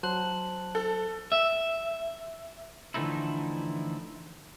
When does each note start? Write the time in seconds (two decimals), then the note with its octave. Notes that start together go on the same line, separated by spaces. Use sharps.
0.03 F#3 C5 A5 F#6 F#7
0.75 A4
1.32 E5
2.94 D3 E3 F3 A3 D#4 E4